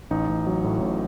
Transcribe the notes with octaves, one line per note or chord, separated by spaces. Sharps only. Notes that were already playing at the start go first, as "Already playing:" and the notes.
A1 D#4
A1
F#3
A2
A1